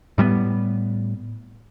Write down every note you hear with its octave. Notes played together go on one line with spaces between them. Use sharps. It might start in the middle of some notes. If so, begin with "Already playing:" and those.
A2 G3 G#3 B3